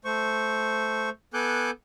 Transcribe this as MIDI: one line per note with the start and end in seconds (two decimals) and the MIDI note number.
0.05 1.10 57
0.05 1.10 72
0.05 1.10 85
1.34 1.71 59
1.34 1.71 69
1.34 1.71 80
1.34 1.71 86
1.34 1.71 90
1.34 1.71 91